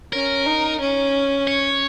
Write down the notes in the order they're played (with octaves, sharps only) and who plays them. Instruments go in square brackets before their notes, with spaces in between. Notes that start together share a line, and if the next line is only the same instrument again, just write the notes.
[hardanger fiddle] C#4 [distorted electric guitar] A#4
[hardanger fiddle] D#4
C#4
[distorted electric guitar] C#5